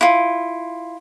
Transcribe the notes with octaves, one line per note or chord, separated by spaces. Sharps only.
E4 F4